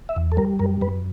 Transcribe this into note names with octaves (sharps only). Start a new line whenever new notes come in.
E5
E2
A4
G3 A#4
F#2 A#4
F#2 B4